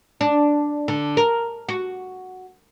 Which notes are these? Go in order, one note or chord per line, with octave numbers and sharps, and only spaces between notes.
D4
D3
A#4
F#4